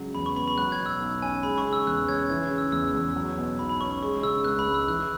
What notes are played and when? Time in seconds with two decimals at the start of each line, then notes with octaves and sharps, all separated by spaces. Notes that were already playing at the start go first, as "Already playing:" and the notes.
Already playing: C#3 F#3 G#3
0.15 E2 B5
0.26 C#6
0.36 B3 B5
0.48 B5
0.58 F#3 F#6
0.72 G#6
0.79 B2
0.86 E6
1.00 B1
1.22 C#4 G#5
1.43 G#3 B5
1.58 C#6
1.65 C#3
1.73 E6
1.87 E2 F#6
2.08 C#4 G#6
2.29 E3 G#6
2.51 C#3
2.58 E6
2.72 E2 E6
2.94 E2
3.16 F#3
3.38 B2
3.59 B1 B5
3.69 B5
3.81 C#4 C#6
3.91 C#6
4.02 G#3 C#6
4.23 C#3 E6
4.45 C#2 F#6
4.59 B5
4.67 C#2
4.74 E6
4.88 E3 F#6